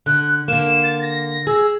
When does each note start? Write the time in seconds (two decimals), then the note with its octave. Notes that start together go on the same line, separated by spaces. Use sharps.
0.06 D3 F#6
0.48 D3 A#3 E7
0.83 A6
1.02 A#6
1.47 G#4 E6